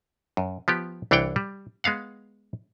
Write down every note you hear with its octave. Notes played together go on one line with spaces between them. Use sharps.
F#2
F3 B3 G4
C2 E3 D4 C#5 F#5 G5
G3
G#3 B3 F5 F#5